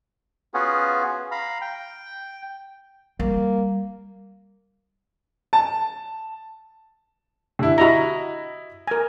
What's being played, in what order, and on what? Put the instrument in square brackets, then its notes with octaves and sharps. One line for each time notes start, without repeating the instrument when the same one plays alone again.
[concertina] B3 C#4 F4 F#4 G#4
F5 A#5 B5
G5
[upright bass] G3 [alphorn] A#3
[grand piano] A5
[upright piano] D3 E4
[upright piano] E4 D#5 B5 [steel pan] F#4 A#5
[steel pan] A#4 G#5